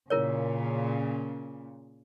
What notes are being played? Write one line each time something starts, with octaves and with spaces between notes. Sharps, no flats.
A#2 C#3 E4 A#4 C#5